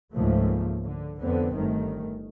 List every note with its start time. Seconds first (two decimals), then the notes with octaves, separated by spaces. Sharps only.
0.15 C#2 G#2 F3 A3 A#3
0.84 D3
1.21 F2 D3 B3 C4
1.53 G1 D#3 A3